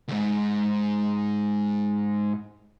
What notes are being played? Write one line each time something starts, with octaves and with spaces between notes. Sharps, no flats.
D2 G#2